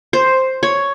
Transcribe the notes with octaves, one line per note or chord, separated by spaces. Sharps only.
C5
C#5